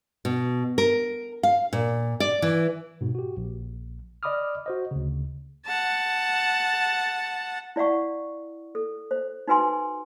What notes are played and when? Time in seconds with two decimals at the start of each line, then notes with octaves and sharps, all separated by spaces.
0.25 B2
0.78 A#4
1.43 F5
1.73 A#2
2.20 D5
2.42 E3
3.01 G#2 B2
3.15 F#4 G4
3.37 A#1
4.23 D5 D#5 B5 D6 D#6 F6
4.66 F#4 C5 D#5
4.91 D2 C#3
5.66 F#5 A5
7.76 E4 D5 F5 F#5 C#6
8.75 A4
9.11 C5
9.48 D#4 F#4 B4 G#5 C6